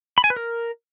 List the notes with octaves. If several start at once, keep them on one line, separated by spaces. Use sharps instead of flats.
B5
G#5
B4
A#4